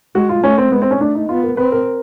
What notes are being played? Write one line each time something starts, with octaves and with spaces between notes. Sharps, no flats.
G#3 F#4
F4
A3 C#4
C4
G#3 B3
C4
C#4
A3 D4
D#4
B3 F4
A#4
C4 B4
A#4